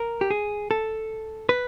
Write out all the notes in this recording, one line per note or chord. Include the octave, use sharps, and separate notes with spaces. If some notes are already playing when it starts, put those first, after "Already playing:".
Already playing: A#4
G4
G#4
A4
B4